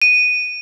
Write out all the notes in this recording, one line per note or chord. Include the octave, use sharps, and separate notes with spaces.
D#7